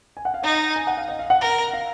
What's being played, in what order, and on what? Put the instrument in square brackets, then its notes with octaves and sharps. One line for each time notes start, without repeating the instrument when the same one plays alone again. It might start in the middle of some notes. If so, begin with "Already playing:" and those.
[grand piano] G#5
F#5
F5
[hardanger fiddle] D#4 [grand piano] D#5
[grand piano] G#5
F#5
F5
D#5
F5
F#5
[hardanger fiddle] A#4
[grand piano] F5